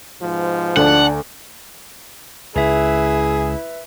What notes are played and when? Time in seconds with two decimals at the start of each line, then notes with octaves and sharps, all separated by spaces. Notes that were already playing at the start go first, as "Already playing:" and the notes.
0.22 G#2 B2 F3
0.77 D2 D4 F#5
2.56 C#2 E4 G#4 B4 E5